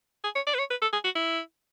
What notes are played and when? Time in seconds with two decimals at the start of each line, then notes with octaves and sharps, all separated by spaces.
0.24 G#4
0.35 C#5
0.47 D5
0.54 B4
0.59 C#5
0.70 B4
0.82 A4
0.93 G#4
1.04 F#4
1.15 E4